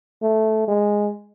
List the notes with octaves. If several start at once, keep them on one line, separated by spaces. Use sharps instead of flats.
A3
G#3